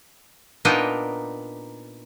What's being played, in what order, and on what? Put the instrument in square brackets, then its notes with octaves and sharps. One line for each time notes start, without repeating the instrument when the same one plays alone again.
[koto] A#2 B3 D4 D#4 A#4 G5